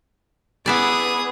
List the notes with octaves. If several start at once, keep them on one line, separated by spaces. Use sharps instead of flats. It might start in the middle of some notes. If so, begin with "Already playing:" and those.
B3 E4 G#4 D5 D#6